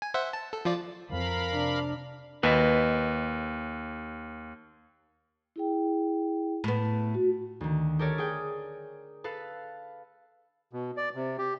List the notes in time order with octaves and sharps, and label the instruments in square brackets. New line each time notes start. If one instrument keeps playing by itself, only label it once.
[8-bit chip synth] G#5
C5 E5 F#5
A5
A4
F3 F4 D5
[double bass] F2 [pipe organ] A#4 F5 B5
[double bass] C3 D4
[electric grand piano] D#2 [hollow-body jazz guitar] B4 D#5 A5
[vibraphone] E4 G#4 G5
[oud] A2 B3
[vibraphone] F#4
[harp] D2 D#3
G4 A4 A#4 C#5 D5
G#4 G5
A4 B4 F5
[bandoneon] B2
D5
C3
G4